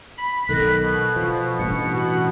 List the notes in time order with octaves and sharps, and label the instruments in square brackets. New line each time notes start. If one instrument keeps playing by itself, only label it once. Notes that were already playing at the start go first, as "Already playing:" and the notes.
[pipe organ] B5
[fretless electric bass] B1 D#3 [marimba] A4 A#6 [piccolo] F#6
[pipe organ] B2
[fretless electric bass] F3
[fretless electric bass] A1 G2 [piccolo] C#7
[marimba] F#4 [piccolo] F#5